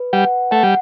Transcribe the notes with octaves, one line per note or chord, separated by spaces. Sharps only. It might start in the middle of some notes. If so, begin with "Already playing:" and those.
Already playing: B4
G3 F#5
A3 F#5
G3